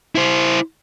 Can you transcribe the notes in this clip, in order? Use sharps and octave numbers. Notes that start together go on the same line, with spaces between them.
E4 C5